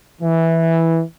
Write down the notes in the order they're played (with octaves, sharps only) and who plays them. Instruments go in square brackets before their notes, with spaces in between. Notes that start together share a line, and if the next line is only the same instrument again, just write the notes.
[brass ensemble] E3